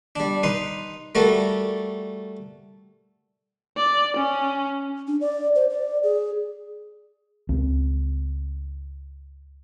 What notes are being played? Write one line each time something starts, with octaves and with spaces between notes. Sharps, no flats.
G3 D4
D#4 B4 C6
G3 A3 F#4 A4 A#4
D5
C#4
D4
D5
C5
D5
G#4
C#2 C4